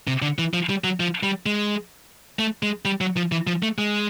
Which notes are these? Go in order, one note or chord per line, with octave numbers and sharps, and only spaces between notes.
C3
D3
E3
F3
G3
F#3
F3
G3
G#3
A3
G#3
G3
F#3
F3
E3
F3
A3
G#3